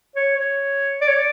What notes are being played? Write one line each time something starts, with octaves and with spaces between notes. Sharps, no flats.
C#5
C#5
D5
C#5
D5